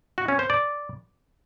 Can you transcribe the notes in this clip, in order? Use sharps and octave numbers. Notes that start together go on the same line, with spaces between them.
F#4
C#4
C5
D5